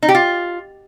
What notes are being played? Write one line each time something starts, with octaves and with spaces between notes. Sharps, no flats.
D#4
G4
F4